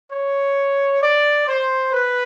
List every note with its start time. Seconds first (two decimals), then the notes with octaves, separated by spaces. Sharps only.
0.10 C#5
1.02 D5
1.47 C5
1.93 B4